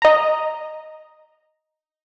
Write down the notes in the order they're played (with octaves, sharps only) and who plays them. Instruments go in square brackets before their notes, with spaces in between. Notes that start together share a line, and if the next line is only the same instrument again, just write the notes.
[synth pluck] D#5 A#5